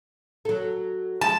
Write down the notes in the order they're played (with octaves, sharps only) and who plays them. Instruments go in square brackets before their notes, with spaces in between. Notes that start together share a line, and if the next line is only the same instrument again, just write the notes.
[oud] F#3 A4
[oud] F3 G#3 [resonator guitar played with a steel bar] A5